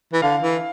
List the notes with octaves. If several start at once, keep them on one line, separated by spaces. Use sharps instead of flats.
E3
D3 F5
E3